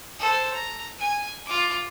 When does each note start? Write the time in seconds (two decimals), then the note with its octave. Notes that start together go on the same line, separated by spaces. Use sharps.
0.19 A4 C5
0.53 A#5
0.98 G#5
1.46 F4 D6